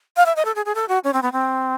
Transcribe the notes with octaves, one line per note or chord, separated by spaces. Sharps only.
F5
E5
D#5
A4
G#4
G#4
A4
F#4
C#4
C4
B3
C4